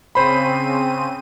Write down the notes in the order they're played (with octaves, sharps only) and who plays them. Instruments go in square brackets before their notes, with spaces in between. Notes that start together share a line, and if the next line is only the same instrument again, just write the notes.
[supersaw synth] C#3 C4 D#7 [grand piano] C5 B5